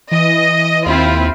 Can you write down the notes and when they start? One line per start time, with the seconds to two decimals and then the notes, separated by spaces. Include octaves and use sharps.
0.11 E3 D#5
0.86 D#2 C4 E4 F4